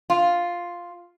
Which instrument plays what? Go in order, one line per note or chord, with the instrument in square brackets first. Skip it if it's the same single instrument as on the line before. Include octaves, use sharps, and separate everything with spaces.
[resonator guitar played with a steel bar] F4